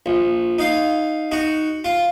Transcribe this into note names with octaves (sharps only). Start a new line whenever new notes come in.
A#1
D#4 F5
D#4 F#4
F4